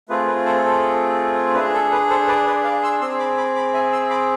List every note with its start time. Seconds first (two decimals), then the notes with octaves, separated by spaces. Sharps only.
0.09 A3 C4 F4 G#4 B4
0.28 B4
0.45 A4 C5
0.64 A4
1.55 D4 G#4 B4
1.74 A4
1.92 B4
2.09 A4 C5
2.28 B4 D5
2.46 B4 D5
2.64 D5 F5
2.83 C6 E6
3.01 C4 G#4 C6 E6
3.19 B5 D6
3.37 B5 D6
3.55 B5 D6
3.74 E5 G#5
3.92 C6 E6
4.10 B5 D6